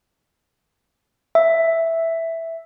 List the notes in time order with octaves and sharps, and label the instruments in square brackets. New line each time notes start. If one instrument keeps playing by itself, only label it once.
[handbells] E5